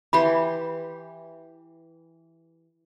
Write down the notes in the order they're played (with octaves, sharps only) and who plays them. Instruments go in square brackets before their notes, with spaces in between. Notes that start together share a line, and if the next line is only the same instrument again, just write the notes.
[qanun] E3 G4 C6 [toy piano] B5